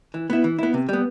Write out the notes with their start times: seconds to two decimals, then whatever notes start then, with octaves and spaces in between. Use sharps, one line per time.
0.14 E3
0.30 B3 E4
0.44 E3
0.58 B3 E4
0.74 C3
0.89 G3 B3